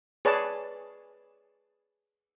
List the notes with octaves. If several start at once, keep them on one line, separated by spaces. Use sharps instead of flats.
G#4 B4 C#5 D5 A5